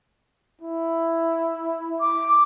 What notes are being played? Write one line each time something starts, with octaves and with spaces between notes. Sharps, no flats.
E4
D6